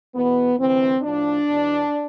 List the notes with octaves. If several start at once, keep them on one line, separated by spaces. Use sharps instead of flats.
E2 B2 B3
D2 C3 E3 C4
A2 F3 D4
E2 B2